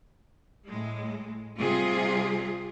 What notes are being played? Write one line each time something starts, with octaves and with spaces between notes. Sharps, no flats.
A2 G#3
C3 G3 F4 G#4